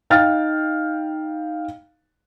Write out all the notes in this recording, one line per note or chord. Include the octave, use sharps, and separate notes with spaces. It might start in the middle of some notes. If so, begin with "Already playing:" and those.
D#4 F5 G5 F6 A6